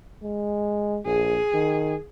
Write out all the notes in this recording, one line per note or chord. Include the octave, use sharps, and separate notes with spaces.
G#3
A#1 G#4
D#3